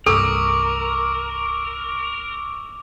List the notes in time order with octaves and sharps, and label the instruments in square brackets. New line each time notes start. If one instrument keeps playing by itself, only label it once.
[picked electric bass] C2 G2 [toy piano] A4 [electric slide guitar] A#4 [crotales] C#6 D6 E6